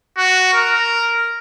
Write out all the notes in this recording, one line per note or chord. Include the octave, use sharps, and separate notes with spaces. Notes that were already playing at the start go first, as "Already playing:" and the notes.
F#4
A#4